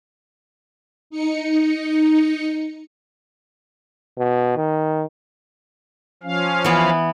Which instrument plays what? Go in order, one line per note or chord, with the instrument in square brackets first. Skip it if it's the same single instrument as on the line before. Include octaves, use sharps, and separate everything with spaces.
[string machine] D#4 C#7
[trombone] B2
D#3
[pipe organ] F3 C#4 F5
[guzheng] E3 B3